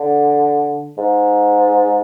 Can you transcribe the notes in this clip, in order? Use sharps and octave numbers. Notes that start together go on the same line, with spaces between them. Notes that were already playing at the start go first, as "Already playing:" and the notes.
Already playing: D3
G#2